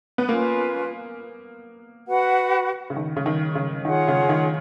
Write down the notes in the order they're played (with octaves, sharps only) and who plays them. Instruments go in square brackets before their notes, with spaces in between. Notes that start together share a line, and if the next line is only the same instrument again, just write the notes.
[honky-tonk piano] B3
[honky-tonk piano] A#3 [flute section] C#4 F4 B4
[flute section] F#4 B4 F#5 B5
[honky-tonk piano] C#3
D#3
C#3
D#3
C#3
[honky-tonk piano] D#3 [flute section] F4 G#4 C#5 F#5
[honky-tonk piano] C#3
D#3